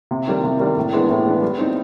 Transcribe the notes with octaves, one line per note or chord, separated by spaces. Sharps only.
C3
D#3 G3 A#3
C3
D#3 G3 A#3
A2
E3 G#3 B3 D4
A2
E3 G#3 B3 D4
G3
C4 D#4